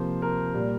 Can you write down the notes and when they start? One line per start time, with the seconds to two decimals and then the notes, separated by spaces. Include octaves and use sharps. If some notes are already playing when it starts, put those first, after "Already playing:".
Already playing: C3 F3 A#3 C5
0.22 A#4
0.54 A#2 G3 A#3